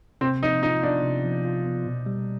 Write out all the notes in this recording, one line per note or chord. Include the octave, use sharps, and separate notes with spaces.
C3 C4
F3 D#4
D#4 F4
B3 D4
C3
F3
F4
B3
B2
G3